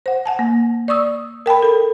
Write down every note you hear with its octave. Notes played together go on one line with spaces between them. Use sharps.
C5 F#5
F#5 G#5 A5
A#3
D5 C#6 D#6 E6
A#4 G5 A5 B5
A4 A#4